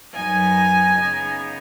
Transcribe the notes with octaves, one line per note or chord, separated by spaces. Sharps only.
F#2 F#3 B3 D#4 G#5
C#3 B3 D#4